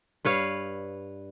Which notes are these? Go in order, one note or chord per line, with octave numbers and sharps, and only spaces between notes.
G2 B4 C#5 F5